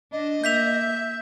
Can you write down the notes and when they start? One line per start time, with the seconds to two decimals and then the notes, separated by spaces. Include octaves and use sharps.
0.13 D4 D#5
0.44 A#3 E5 G6 B6 F7